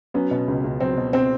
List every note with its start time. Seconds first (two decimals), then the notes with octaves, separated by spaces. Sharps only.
0.14 F#3 B3 C#4
0.31 B2
0.48 C#2
0.64 C#2
0.80 F#3 C4
0.97 B2
1.13 C4